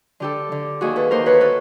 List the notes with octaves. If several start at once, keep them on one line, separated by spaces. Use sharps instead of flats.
D3 G4 A4
D3
D#2 F#4 G#4
A4 B4
D#2 A#4 C5
B4 C#5
A4 B4